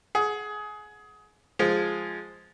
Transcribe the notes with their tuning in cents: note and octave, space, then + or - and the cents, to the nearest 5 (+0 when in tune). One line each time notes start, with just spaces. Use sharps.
G#4 +20 F#5 +0
F3 +0 G#3 +0